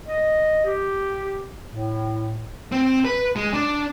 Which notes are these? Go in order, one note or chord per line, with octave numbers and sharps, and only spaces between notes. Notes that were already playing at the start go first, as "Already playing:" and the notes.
D#5
G4
A2
C4
B4
G#3
D4